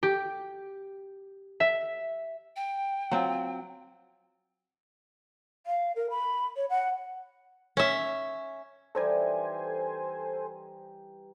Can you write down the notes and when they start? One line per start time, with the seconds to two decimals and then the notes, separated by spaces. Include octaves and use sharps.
0.03 G4
1.60 E5
2.56 G5
3.11 F#3 C4 F4
5.67 F5
5.96 A#4
6.10 B5
6.56 C#5
6.70 F#5
7.77 C#4 E5
8.95 E3 G3 D#4 A4 C5 G#5